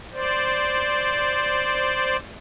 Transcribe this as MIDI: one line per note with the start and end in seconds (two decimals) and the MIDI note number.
0.13 2.17 72
0.13 2.17 74